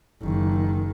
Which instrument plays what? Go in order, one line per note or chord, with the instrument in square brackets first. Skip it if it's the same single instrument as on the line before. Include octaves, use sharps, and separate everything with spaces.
[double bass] F#1 D#3